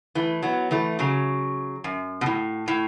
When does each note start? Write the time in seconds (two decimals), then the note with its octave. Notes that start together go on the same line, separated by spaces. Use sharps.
0.15 E3 A3
0.42 F#3 B3
0.71 E3 A3
0.99 C#3 F#3
1.84 F#2
2.21 B2
2.26 A2
2.68 A2